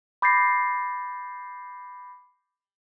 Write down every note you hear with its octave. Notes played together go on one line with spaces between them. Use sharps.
B5 D6 G6 A6 A#6 C7